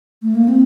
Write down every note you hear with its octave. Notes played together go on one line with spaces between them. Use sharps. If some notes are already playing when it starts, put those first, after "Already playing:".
A3
A#3
C4